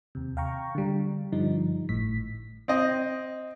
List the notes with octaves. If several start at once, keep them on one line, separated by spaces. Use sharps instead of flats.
D#2 C3
F5 G5 A#5 C#6
D3 G3
G2 D3 F3 G3 D#4
G#1 A2 B6
C4 D#5